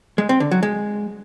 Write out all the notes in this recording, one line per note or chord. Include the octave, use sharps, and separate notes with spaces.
G#3
C4
D3
F#3
G#3